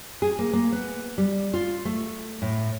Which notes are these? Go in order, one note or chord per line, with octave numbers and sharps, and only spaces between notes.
G#4
A#3
A#3
B3
G3
F4
A3
A2